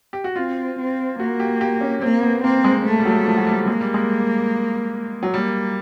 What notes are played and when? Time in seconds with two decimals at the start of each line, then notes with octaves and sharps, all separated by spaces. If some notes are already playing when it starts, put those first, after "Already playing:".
0.13 G4
0.24 F#4
0.36 C4 F4
0.78 C4
1.19 A#3 F#4
1.40 G4
1.61 G4
1.81 C#4
2.01 A#3 C4
2.23 B3
2.43 A#3 C4
2.64 G#3
2.85 A3
2.99 G3
3.05 F#3
3.26 F3
3.37 F#3
3.47 G3
3.68 G#3 A#3
3.81 G3
3.94 G#3
5.23 F#3
5.33 G3 A#3